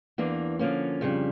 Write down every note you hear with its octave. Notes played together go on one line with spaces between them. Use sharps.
E2 E3 A#3 D4
D3 F3 A#3 C#4
F2 C#3 G3 D4